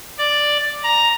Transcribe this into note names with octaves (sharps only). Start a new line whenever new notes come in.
D5
A#5